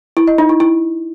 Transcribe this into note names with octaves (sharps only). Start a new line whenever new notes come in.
E4
D#5
D#4
E4
E4